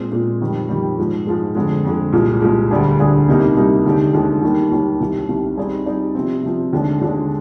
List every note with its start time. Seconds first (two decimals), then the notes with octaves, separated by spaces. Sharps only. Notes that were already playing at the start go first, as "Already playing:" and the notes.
Already playing: A#2 G#3 C4
0.12 A#2 G#3 C4
0.41 F2 D#3 G3
0.69 F2 D#3 G3
0.98 G#2 F3 G#3
1.27 G#2 F3 G#3
1.55 F2 D3 G#3
1.84 F2 D3 G#3
2.12 C2 A#2 G#3
2.42 C2 A#2 G#3
2.71 D2 D3 G3 D4 G#4
2.99 D2 D3 G3 D4 G#4
3.28 C2 C3 G3 A#3 D#4
3.56 C2 C3 G3 A#3 D#4
3.86 D#2 D3 G#3 D#4 G4
4.14 D#2 D3 G#3 D#4 G4
4.42 D#2 D#3 G3 A#3 D#4
4.71 D#2 D#3 G3 A#3 D#4
5.00 C2 C3 D#3
5.29 C2 C3 D#3
5.57 G3 C4 D#4 G#4 D5
5.86 G3 C4 D#4 G#4 D5
6.15 C3 F3 C4
6.43 C3 F3 C4
6.73 D#2 D3 G#3 D4
7.01 D#2 D3 G#3 D4